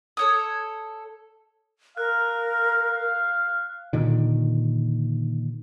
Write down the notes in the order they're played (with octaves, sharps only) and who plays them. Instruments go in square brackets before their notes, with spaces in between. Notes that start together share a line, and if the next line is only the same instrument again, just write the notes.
[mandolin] A4 C#5 D#6
[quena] A#4 [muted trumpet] F5 [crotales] F#6
[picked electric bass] A#2 D3 D#3